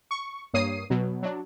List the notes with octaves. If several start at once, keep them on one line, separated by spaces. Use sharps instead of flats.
C#6
G2 A#3 C#5 D#6 C7 D#7
B2 F#3
F#3 D4